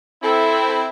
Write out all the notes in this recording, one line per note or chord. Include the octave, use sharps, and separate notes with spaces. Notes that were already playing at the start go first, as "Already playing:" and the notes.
C4 E4 A4 B5